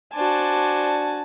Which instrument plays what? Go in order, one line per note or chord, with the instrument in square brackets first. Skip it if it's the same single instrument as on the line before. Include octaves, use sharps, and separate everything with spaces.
[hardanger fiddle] D4 C5 [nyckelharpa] F#4 G#5 [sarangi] A5